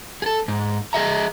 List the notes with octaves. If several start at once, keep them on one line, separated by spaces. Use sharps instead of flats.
G#4 A4
G#2
G#4 D#5 E5 A#5